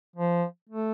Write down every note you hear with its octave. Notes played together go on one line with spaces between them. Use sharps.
F3
A3